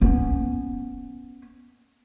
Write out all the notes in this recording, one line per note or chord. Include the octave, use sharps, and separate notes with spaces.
B3 C#4